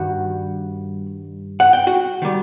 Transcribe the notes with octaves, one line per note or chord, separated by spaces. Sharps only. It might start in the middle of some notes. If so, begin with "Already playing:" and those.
Already playing: G2 D#3 G3 F#4 F#5
F#5
G5
F#4 F#5
D#3 G3